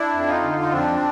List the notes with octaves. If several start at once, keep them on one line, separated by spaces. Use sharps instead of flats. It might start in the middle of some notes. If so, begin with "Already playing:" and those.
Already playing: D4 E4
F2
D#4 F4
D3
D#4
F2 C4 D4